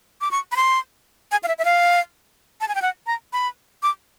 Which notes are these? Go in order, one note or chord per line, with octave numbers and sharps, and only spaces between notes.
D6
C#6
B5
C6
G#5
F5
E5
E5
F5
A5
G#5
G5
F#5
A#5
B5
D6